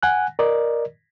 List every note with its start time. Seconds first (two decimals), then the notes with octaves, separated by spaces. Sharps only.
0.03 F#5 G#5 F#6
0.39 A#4 D5 D#5